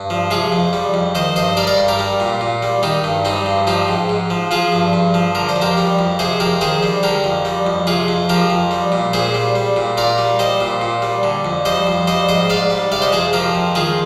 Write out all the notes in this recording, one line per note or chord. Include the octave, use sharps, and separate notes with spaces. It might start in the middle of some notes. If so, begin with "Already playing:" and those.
Already playing: G2
F3
C3 F4 G#4
F2
G3
F2
D#3 C5 D#5
G2 C5 D#5
G3 A#4 D5
A#4 D5
G2
G4 A#4
G3
A#2
A#2
G3
D#3 D#4 G4
G2
G3 C4 D#4
G2
F3 D#4 G4
G#2
G#2
F3
F3 F4 G#4
G2
G2
F3
D3 A#4
C5
F2
G4 A#4
G3
F2
C3 G#4 C5
F2 G4 A#4
D#3 G#4 C5
G3
D3 G4 A#4
F2
G3
F2
C3 F4 G#4
F2
F3 G4 A#4
F2
G3
A#2
A#2 G#4 C5
G3
G3
A#2
A#2 A#4 D5
G3
G3 C5 D#5
A#2
A#2
G3
D3
F2
G3 C5 D#5
F2
G3 C5 D#5
G#2 C5 D#5
G#2 D5 F5
G3
C3 D5 F5
C5 D#5
F2 G#4 C5
F3 G4 A#4
F2
D#3 F4 G#4